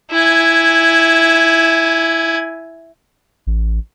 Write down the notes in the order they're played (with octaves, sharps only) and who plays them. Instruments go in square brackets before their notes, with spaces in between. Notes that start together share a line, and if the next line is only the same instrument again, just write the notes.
[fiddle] E4 G#5
[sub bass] A1